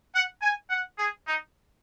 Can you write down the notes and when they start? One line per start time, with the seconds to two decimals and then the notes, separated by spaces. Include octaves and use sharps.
0.14 F#5
0.42 G#5
0.70 F#5
0.98 G#4
1.26 D#4